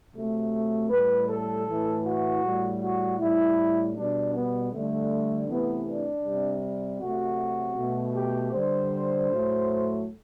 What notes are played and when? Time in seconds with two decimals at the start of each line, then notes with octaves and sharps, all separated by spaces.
0.13 C3 F#3 A3
0.89 A2 G3 B4
1.28 A4
1.65 A2 E3 A3
2.04 F#4
2.42 A2 G3
2.80 F#4
3.18 A2 G3 E4
3.94 B2 G3 D4
4.32 B3
4.71 D3 G3 A3
5.47 C3 E3 A3 B3
5.86 D4
6.23 C3 G3
6.99 C3 F#3 A3 F#4
7.76 B2 A3
8.14 G4
8.52 D3 G3 C5
9.28 A2 F#3 A3